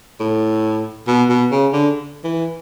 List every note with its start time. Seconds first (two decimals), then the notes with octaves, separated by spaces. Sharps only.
0.20 A2
1.07 B2
1.29 B2
1.51 C#3
1.73 D3
2.24 E3